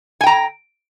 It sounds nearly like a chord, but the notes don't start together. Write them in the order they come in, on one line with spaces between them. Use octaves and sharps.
G#5 G5 A#5